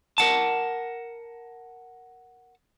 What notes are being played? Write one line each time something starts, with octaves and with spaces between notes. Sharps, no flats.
A#4 F#5 A5